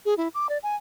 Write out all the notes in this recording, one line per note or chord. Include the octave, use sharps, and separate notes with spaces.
G#4
E4
D6
D5
G#5